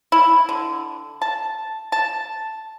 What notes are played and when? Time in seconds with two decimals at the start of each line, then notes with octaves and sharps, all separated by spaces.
0.12 E4
0.49 D3
1.22 A5
1.92 A5